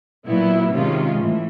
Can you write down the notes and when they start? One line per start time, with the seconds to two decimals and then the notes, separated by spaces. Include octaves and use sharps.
0.26 A#2 F#3 B3 E4
0.72 C3 D#3 G#3 C#4 F4
1.18 A2 E3